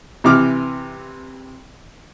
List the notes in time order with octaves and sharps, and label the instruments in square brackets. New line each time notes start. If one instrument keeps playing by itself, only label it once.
[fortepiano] C3 E3 D6 F6